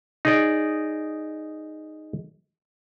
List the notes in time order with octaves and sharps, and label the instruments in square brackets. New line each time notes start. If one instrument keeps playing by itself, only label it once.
[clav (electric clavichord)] D#4 G#4 D5